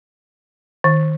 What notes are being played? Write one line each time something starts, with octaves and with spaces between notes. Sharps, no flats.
D#3